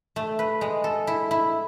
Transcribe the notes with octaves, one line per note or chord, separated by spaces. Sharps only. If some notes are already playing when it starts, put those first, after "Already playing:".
A3
B4
G#3
A4
E4
E4